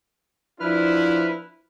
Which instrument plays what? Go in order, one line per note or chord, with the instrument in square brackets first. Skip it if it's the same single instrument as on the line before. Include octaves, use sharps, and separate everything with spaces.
[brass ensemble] F3 D4 E4 [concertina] B4 F6